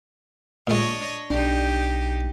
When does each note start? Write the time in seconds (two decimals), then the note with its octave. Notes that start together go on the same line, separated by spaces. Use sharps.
0.67 A#2 G#3 D4 C#5 D#5
1.30 B1 D4 D#4 G4